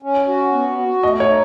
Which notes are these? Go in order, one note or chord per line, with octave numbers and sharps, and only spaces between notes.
C#4
F#4
B3
F#4
A3 D#5
C#5
D#4